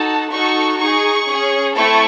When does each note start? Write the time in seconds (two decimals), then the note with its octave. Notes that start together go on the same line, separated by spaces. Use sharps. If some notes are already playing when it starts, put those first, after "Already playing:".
Already playing: D#4 F#4 A4 A5
0.31 D#4 F#4 A4 C#6
0.78 D#4 G#4 C#6
1.27 C#4 G#4
1.75 A3 C4 E4 A4 C#6